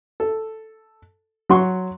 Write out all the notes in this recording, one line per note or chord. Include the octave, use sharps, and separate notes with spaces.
A4
F#3 F#5 C6 C#6